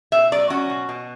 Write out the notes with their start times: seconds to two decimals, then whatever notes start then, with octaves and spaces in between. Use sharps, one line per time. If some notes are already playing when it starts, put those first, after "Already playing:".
0.12 B2 E5
0.32 F#3 D5
0.50 C#4 F#4
0.70 B2
0.89 B2